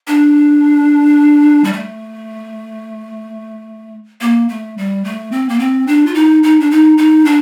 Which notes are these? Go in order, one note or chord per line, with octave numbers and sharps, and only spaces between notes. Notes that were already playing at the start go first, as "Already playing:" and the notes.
D4
G3
A3
A#3
A3
G3
A3
C4
A#3
C4
D4
F4
D#4
D#4
D4
D#4
D#4
D4